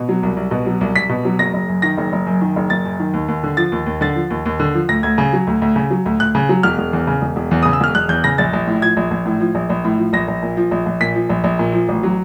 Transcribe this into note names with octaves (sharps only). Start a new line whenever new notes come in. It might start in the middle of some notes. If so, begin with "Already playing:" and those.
Already playing: B2
F#3
C2
C2
B2
F#3
C2
C2 B6
B2
F#3
F#1 A#6
F#1
F#2
D#3 A#6
F#1
F#1
F#2
D#3
F#1
F#1 A6
F#2
D#3
D#2
D#2
D3
F3 A6
D#2
D#2
D3 A6
F3
D#2
D#2
D3
F3
D2 A#6
D2 G#6
C#3
F#3
D2
D2
C#3
F#3
D2
D2 F#6
C#3
F#3
E1 F6
E1
E2
C#3
E1
E1
E2
D#6
C#3
E6
E1 F6
E1 F#6
E2 G6
C#3 A#6
A#1 A6
A#1
A2
F3 G#6
A#1
A#1
A2
F3
A#1
A#1
A2
F3
A#1 A#6
A#1
A#2
F3
A#1
A#1
A#2 B6
F3
A#1
A#1
A#2
F3
A1
F#3